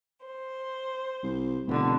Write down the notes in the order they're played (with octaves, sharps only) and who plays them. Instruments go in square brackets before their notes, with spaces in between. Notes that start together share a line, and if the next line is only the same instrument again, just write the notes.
[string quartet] C5
[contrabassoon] C2
[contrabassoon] F1 [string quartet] B2 D3